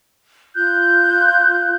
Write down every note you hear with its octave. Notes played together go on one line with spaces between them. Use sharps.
F4 F#6 G6